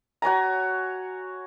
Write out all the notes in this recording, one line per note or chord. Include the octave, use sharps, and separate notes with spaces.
F#4 C#5 G#5 A#5